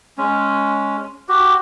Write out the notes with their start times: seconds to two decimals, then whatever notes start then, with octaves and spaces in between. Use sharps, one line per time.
0.18 G#3 C#4
1.29 F#4 G4